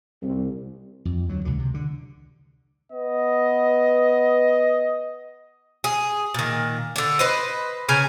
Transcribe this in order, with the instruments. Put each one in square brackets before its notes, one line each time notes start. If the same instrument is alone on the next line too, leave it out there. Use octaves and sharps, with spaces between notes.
[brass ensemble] C2
[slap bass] F2
D2 F#3
C#2 B2 D3
C3
D3
[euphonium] B3 [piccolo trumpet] D#5
[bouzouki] G#4
A#2 D#3
D3 D4
B4 C5 D#5
C#3 C#4 G#5 A#5